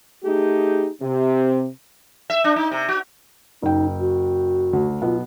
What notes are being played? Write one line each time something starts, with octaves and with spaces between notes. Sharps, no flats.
A3 D#4 G4 G#4
C3
E5
D4
D#4
C3
F#4
F#1 D#4 G5
F#4
D2
B1 B3 F4